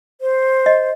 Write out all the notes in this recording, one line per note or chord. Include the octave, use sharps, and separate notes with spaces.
C5
D#5